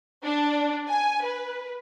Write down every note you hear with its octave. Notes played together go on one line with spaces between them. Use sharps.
D4
G#5
B4